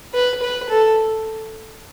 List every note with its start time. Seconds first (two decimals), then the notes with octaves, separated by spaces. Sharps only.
0.14 B4
0.42 B4
0.69 A4